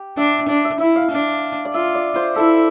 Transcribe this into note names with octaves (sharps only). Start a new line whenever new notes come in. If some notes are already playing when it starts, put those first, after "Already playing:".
Already playing: G4
D4 E5
D4 E5
E5
E4 E5
F5
D4
D5
F4 E5
D5
C5
E4 A4